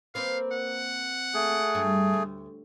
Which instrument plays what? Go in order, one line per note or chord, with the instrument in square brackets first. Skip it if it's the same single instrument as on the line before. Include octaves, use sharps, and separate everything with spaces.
[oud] A#3 C4 B4 [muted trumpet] F5
[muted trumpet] F#5
[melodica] A3 G#4
[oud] G2
D2